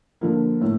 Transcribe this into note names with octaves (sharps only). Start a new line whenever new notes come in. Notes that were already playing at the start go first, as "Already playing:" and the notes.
D3 F3 A#3
A2